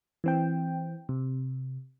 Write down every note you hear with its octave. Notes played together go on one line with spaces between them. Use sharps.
E3 C4 G5
C3